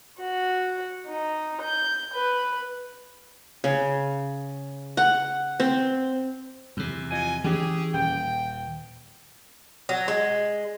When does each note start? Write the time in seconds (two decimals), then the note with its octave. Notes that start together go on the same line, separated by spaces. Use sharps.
0.20 F#4
1.08 D#4
1.62 G6
2.14 B4
3.64 C#3
4.97 F#5
5.60 C4
6.77 E2 C3
7.11 F3 D#5 G#5
7.44 E3 C#4 G4 G#4
7.94 D#1 G5
9.89 F#3
10.08 G#3